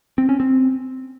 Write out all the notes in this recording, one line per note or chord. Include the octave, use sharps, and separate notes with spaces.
C4
C#4
C4